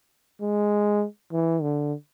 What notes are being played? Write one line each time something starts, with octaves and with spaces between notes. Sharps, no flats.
G#3
E3
D3